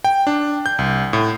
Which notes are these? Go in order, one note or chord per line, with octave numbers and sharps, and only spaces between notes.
G5
D4
G6
C2
A2